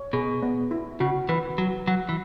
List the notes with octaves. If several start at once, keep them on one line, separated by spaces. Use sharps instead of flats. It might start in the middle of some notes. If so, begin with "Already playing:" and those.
Already playing: C#5
B2 G#4
B3
E4
C#3 F#4
E3 B4
F#3 F#4
F#3 F#5
E3